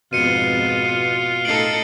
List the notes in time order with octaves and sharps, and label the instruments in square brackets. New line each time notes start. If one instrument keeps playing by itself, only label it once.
[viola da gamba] F2 G#2 B3 [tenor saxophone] B2 [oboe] F4 [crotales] C#7 D#7
[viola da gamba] A2 D#4 A4 [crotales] C7 D7 F#7